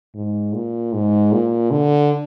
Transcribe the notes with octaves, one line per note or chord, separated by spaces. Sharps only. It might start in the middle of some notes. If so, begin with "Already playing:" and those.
G#2
A#2
G#2
A#2
D3